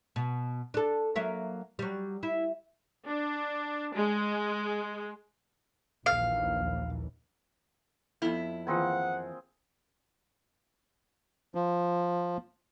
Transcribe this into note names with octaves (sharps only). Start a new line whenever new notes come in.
B2
D4 A4
F#3 A#3 E5
F#3 G3
E4
D4
G#3
A#1 D#2 E3 F5
F2 B3 E4 A4 B5
D#3 E3 A#3 C4 F4 G#4 F#5
F3